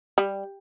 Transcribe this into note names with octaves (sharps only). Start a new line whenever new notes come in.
G3